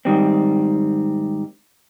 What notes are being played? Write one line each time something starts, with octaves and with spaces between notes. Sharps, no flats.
G#2 D#3 G3 C4